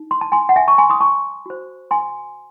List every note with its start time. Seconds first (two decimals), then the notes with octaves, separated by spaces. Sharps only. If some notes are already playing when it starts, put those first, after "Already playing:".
Already playing: D#4
0.11 C6
0.21 A5
0.32 G#5 C6
0.49 F#5
0.56 E5 G#5
0.68 A5 C#6
0.78 G#5 C6
0.90 C6 D#6
1.01 A5 C#6
1.46 F#4 C5
1.91 G#5 C6